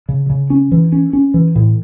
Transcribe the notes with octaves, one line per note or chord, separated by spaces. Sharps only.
C#3
C#3
C#4
E3
C#4
C#4
E3
A2